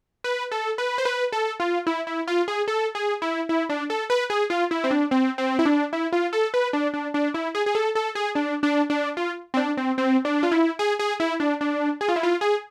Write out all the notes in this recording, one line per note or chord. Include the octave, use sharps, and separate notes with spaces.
B4
A4
B4
C5
B4
A4
F4
E4
E4
F4
G#4
A4
G#4
E4
E4
D4
A4
B4
G#4
F4
E4
C4
D4
C4
C4
E4
D4
E4
F4
A4
B4
D4
D4
D4
E4
G#4
G#4
A4
A4
G#4
D4
D4
D4
F4
C4
D4
C4
C4
D4
F4
E4
G#4
G#4
E4
D4
D4
G#4
F4
E4
F4
G#4